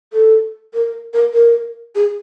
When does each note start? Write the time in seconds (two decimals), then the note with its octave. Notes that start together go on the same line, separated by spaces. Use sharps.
0.13 A4
0.74 A#4
1.13 A#4
1.34 A#4
1.95 G#4